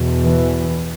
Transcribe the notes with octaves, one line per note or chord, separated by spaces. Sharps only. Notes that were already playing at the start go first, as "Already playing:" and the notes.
Already playing: E2 B2
E3